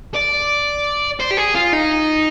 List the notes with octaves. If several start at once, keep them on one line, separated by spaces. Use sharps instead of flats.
D5
C5
G4
G#4
F4
D#4